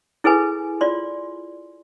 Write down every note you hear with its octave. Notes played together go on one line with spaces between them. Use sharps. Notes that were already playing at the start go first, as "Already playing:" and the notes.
E4 G#4 A4 B4 G#5
F4 D5 C6